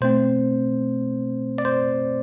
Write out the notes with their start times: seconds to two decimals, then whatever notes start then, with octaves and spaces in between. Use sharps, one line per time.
0.01 B2 A3 C4 C5
1.58 D5
1.65 C5